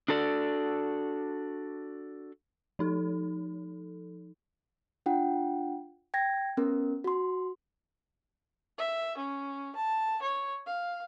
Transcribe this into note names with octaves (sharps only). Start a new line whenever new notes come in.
D4 F#4 A4 D5
F3 D#4 A4
D4 F4 F#5 G5
G5 G#6 A#6
B3 C#4 A#4
F#4 C6
E5
C#4
A5
C#5
F5